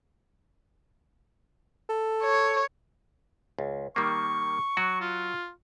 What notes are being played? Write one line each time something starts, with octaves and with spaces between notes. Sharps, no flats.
A4
C#5
C#2
D#3 G3 A#3 C#6
F#3 F#4
F4